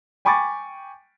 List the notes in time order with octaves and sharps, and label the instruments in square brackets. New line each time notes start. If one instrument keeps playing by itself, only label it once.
[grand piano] G5 G#5 B5 C#6 D6 A6